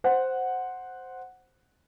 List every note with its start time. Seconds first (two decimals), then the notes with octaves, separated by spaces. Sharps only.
0.04 C5 F#5